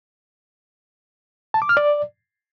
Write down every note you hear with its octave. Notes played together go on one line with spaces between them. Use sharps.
A5
D6
F6
D5